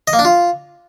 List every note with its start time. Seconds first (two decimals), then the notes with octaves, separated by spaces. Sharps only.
0.07 D#5
0.13 A#3
0.19 D4
0.25 F4